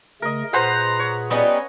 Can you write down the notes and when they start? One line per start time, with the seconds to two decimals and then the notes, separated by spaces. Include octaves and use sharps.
0.22 C#3 A3 A#4 D#5
0.53 A#2 G#4 B4 C5 F#5 A#5
0.99 C#5
1.30 G3 B3 C#4 D#4 D#5